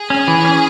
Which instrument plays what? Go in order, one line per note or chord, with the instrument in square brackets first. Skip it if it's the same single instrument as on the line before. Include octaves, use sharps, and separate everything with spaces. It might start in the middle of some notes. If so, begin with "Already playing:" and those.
Already playing: [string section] G#4
[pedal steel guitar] C#4
E3
C#4